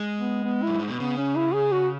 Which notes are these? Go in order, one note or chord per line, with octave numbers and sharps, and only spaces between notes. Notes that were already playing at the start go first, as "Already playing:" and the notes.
Already playing: G#3
B3
B3
F#2 E4
G#2
B2
C#3 B3
C#4
E4
G#4
F#4